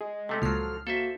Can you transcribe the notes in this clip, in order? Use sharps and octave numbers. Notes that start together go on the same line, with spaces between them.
G#3 G#4
C3 A3 C#4 A4
C#2 A#2 F3 F#3 F6 C7
A#3 F#4 A4 C5 E5